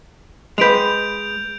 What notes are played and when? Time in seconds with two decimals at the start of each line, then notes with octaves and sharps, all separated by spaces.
0.58 G#3 B4 G6 D7 F7